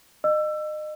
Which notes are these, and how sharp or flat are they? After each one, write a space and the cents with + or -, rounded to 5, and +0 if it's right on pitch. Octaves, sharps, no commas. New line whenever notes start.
D#5 -30 E6 +20